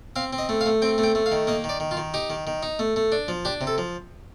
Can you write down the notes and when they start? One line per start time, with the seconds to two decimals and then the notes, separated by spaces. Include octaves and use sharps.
0.16 C4 F5
0.33 C4
0.38 D#5
0.49 A3
0.61 F5
0.66 A3
0.82 C4 G5
0.98 A3
1.03 G5
1.15 A3
1.26 F5
1.32 D#3
1.47 A#3 D#5
1.64 D#3 D5
1.80 D#3
1.91 F4
1.97 D#3
2.14 D#4 G4
2.30 D#3
2.47 D#3
2.63 D#4
2.79 A3
2.96 A3
3.12 D4
3.28 F3
3.45 D4 G4
3.61 C3
3.67 A4
3.78 F3